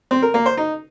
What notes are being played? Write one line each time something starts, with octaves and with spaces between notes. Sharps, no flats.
C4
A#4
A#3
C5
D#4